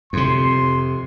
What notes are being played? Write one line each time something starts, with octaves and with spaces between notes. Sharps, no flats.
F2 C3 C6